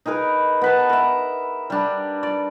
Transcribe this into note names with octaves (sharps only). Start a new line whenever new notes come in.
D#4 G#4 A#4 B4
B3 B4 A5
A#4 E5
G3 D4
D5